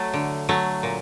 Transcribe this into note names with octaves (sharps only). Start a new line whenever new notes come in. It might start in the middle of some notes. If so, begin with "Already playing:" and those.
Already playing: F#3 A3
D3
F#3 A3
A#2